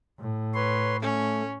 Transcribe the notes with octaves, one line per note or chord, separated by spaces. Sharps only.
A2
B4 C#5 C6
A3 C#4